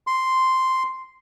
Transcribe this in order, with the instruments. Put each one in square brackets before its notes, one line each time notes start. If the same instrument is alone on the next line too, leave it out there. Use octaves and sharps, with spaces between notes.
[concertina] C6